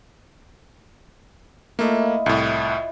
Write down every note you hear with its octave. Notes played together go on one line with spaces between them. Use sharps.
A3 A#3 E4 F4 D#5
C2 A2